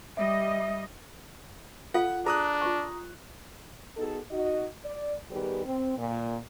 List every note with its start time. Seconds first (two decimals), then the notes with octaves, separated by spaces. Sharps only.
0.17 G3 D#5 E5
1.94 F4 A4 F5 F#5
2.26 D4 G#4 A#5 D#6 F#6
2.62 F4 C#6
3.97 B3 D#4 F#4 G#4 A4
4.31 D#4 F#4 D#5
4.85 D5
5.31 D#3 G3 B3 G4 G#4 B4
5.66 C4
5.98 A#2